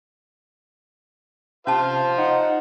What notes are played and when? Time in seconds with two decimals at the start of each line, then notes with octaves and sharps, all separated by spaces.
1.67 C3 C#4 F4 C5 F5 A5
2.18 D#4 F#5